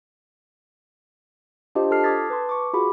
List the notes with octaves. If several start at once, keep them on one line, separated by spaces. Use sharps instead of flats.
D4 F4 G4 C5 D#5
F4 A4 A5 F6 C7
D6 D#6 G#6 A6 B6
B4 A5 C6
C#6 D6
F4 F#4 G#4 B5 D6